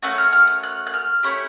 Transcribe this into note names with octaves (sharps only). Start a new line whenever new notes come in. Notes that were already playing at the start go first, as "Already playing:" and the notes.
A3 C#4 F#4 F#6
F6
F6
F6
F#6
F#6
F6
A3 C#4 E4 G4